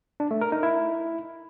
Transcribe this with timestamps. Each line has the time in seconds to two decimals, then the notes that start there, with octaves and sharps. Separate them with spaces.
0.20 D4
0.31 A3
0.41 A#4
0.52 D#4
0.63 E4